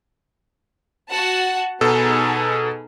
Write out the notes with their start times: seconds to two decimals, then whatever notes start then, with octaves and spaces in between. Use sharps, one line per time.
1.10 F#4 F#5 A5
1.81 B2 B3 D#4 G#4 A4